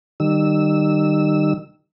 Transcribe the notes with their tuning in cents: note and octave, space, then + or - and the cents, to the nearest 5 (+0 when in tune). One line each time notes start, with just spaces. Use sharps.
D#3 -30 G3 -5 E6 -10